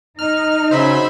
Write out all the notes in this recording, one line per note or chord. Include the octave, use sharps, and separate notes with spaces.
D#4 F6
C#3 F#3 C5 E5 B5